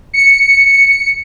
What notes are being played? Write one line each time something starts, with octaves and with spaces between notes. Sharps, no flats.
C#7